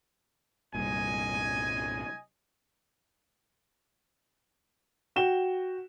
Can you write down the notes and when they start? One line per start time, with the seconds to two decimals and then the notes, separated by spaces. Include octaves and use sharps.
0.75 C2 G2 A#2 D#5 G#5
5.16 F#4 G5 E7 G7